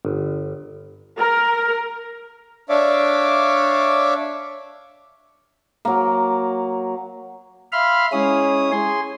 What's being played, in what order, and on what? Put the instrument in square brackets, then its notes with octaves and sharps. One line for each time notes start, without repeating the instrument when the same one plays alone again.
[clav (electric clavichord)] G1
[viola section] A#4
[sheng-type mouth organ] D4 C#5 D5 E5 F5 D6
[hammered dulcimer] F#3 A#3
[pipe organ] E5 F5 B5 C6 F6
G#3 C#4 E4 G#4 C#5 D#6
G#4 G#5 C6